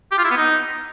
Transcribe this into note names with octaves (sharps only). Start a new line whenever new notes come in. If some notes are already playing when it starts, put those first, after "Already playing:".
G4
F4
E4
B3
D#4